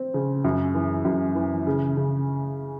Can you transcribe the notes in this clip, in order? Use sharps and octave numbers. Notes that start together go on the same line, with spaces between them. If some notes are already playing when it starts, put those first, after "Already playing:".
Already playing: C4
C#3
F#2
E3
F#2
E3
C#3
C#3